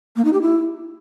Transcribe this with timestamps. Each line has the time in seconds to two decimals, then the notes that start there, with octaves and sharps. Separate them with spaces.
0.16 A#3
0.25 D#4
0.33 G4
0.42 E4